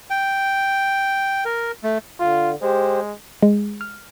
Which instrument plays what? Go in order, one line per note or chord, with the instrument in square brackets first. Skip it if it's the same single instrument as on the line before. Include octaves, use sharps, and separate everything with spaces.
[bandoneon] G5
A#4
A3
[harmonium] D3 [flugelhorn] F4
[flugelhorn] G#3 [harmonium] G4 C5
[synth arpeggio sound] G#3
F6